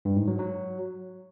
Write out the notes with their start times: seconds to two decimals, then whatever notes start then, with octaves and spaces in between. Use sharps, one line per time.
0.05 G2
0.16 G#2
0.28 F#3
0.39 F#3